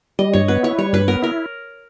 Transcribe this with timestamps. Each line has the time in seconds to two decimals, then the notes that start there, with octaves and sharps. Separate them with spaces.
0.19 G3 D#5
0.33 G2 C#5
0.48 B3 B4
0.63 E4 C#5
0.78 G3 C#5
0.93 G2 B4
1.08 B3 A#4
1.22 E4 A#4